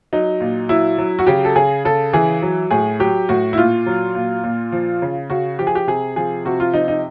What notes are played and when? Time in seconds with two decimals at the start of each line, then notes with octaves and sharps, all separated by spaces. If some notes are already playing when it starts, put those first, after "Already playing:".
0.13 F#3 D#4
0.40 A#2
0.69 F#3 E4
0.98 F#3
1.19 F#4
1.27 C#3 G4
1.45 A4
1.56 C#3 G#4
1.85 C#3 A4
2.13 E3 G#4
2.42 F#3
2.71 A2 G#4
3.00 F#3 G4
3.29 A2 F#4
3.53 E4
3.57 A#2 F4
3.86 F#3
4.15 A#2
4.44 A#2
4.72 F3
5.02 C#3
5.30 C#3 F#4
5.59 F3 G4
5.67 G#4
5.75 G4
5.87 C3 G#4
6.16 F3 G#4
6.45 C3 F#4
6.60 F4
6.74 F3 D#4
6.88 D#4